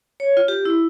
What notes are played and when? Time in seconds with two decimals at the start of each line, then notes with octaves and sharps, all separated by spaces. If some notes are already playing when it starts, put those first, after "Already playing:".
0.20 C#5
0.37 F4
0.48 G4
0.65 E4